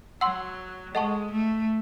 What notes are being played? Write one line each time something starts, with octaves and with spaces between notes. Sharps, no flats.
F#3 F#5 C6 E6
G#3 A4 D#5 F#5 A5 C#6
A3